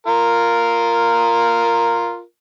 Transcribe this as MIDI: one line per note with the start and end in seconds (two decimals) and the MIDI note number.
0.07 2.21 65
0.07 2.21 70